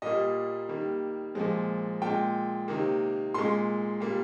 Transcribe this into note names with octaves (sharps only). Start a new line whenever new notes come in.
A#2 G3 A#3 D#5
D#3 G3 A#3
A#2 F3 G#3
A#2 G#3 G5
C3 D#3 A#3
A#2 G#3 C6
A#2 G3 A#3